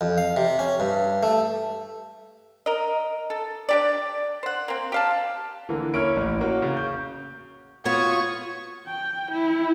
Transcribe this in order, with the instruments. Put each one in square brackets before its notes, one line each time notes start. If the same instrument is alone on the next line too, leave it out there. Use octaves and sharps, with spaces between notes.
[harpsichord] F2
F5
C3
C#4
G2
A3
[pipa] A#4 D#5
A4
D4 G4 D5
C5 F#5
A#3 C4
G4 F5 A5
[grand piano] D3 [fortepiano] E3 A#3
[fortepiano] A#3 C#4 E4 [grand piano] C#5 F6 D7
[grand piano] A1
[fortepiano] A#3 [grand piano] F#4 A#4 C#5
[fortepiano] C#3
[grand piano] G6
[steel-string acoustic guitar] B3 F4 F#4 [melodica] C#5 [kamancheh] C#6 D#6
[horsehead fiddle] G5
E4